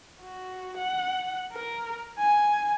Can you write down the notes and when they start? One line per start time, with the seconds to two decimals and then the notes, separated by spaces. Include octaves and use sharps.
0.21 F#4
0.78 F#5
1.53 A#4
2.19 G#5